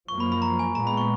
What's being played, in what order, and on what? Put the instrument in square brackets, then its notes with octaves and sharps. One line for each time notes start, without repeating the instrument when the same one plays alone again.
[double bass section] F#2 F3 A#3 [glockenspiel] C#6
[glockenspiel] B5
B5
A#5
G#5
[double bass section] A#2 G#3 B3 [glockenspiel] A#5
[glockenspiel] B5
C#6